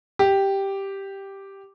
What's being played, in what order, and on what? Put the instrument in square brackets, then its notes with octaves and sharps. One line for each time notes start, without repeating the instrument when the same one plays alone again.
[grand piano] G4